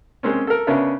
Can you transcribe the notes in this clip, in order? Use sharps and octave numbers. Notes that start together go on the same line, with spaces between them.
G#3 A#3 C4 C#4
A4 A#4
C#3 B3 C#4 D4 A#4 E5